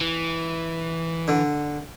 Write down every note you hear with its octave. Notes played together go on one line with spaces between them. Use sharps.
E3
D3